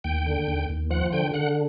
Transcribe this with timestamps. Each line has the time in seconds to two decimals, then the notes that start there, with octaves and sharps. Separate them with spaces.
0.04 D#2 G5
0.26 D3
0.47 D#2
0.69 D#2
0.90 F3 F#5
1.13 D3 G5
1.34 D3 F#5